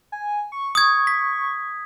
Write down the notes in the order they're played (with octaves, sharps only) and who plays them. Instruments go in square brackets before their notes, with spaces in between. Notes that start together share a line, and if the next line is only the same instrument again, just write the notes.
[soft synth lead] G#5
C#6
[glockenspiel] D#6 G#6
B6